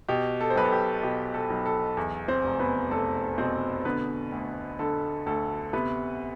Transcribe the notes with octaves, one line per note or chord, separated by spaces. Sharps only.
B2 G4
A4
C5
B1 B4
A4
G4
B2 G4
A4
B1
A4
E2
C4 C5
F1
B3 B4
F1 A4
B2 C4 C5
D3 B3 B4
D2
D3 A4
D2 A4
C3 B3 B4